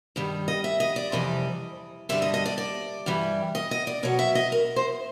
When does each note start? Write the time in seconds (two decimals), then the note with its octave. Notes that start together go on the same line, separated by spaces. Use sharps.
0.16 G2 D#3 G3
0.48 D#5
0.64 E5
0.80 D#5
0.96 D5
1.12 F2 C3 E3 G3 D#5
2.09 G2 D3 G3 E5
2.22 D#5
2.34 D#5
2.46 D5
2.58 D5
3.06 G2 E3 G3
3.55 D#5
3.71 D#5
3.87 D5
4.03 B2 F#3 C#5
4.19 E5
4.35 D#5
4.52 A#4
4.76 C5